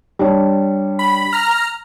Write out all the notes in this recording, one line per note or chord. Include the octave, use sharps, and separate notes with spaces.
G3 D4 C#5
B5
A#5 F6